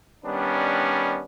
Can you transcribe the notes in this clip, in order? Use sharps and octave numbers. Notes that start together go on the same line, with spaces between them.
D#3 G3 B3 C#4 D4